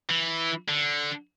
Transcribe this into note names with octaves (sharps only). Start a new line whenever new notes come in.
E3
D3